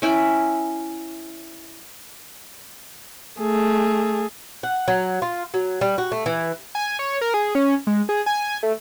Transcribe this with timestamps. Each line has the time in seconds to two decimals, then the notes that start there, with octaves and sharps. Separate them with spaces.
0.02 C#4 E4 G5
3.40 A3 G#4
4.63 F#5
4.88 F#3
5.22 F4
5.54 F#3
5.81 G3
5.98 F#4
6.12 A3
6.26 E3
6.75 G#5
6.99 C#5
7.21 A#4
7.34 G#4
7.55 C#4
7.87 G#3
8.09 G#4
8.26 G#5
8.63 A3